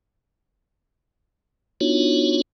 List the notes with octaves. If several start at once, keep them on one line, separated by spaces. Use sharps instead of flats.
B3 D4 D#4 F4 F#4 C#5